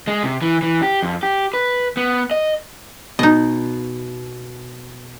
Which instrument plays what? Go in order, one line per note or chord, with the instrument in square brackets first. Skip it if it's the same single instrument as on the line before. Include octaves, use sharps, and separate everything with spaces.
[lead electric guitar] G#3
C3
E3
E3
G4
F2
G4
B4
B3
D#5
[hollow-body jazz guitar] B2 [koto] D#4 D#5